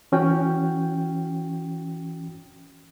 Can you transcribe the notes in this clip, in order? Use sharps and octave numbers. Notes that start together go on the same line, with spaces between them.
E3 C#4 F#4 G5